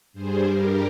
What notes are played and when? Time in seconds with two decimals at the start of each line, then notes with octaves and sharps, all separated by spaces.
0.13 G2 G3 G#4 C5
0.43 G2 G3 G4 A#4